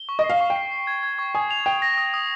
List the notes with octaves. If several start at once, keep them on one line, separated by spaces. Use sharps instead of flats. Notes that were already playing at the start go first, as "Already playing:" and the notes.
Already playing: G7
C#6
D#5
C7
F5
C#6
G5
C7
C7
G#6
G#6
C#6
G#5 D#6
F7
G5 F7
A#6
D#6
D#6